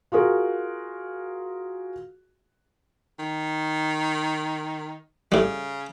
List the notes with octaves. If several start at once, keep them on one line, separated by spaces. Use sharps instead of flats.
F4 F#4 G#4 A#4
D#3
A2 C#3 G3